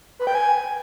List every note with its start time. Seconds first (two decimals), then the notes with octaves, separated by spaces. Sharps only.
0.19 B4
0.27 G5
0.35 G#5